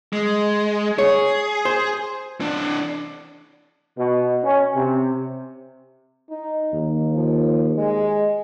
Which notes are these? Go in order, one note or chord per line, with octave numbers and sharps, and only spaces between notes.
G#3
G#4 C#5
C5
E3 D4
B2
C#4
C3
D#4
D#2
F3
G#3